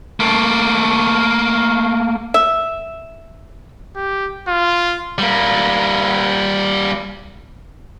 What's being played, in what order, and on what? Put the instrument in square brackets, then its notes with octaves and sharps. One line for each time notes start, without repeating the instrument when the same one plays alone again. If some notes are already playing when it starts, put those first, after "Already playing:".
[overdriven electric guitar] A3 A#3
[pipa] E5
[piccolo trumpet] G4
F4
[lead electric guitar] G3 A#3